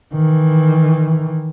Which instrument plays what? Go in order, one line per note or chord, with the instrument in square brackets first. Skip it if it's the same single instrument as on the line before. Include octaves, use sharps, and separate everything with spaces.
[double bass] D#3 E3